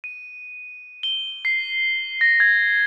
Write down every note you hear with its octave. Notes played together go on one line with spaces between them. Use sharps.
D#7
G7
C7
A#6
G#6